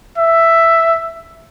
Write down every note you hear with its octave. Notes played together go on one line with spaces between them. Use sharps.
E5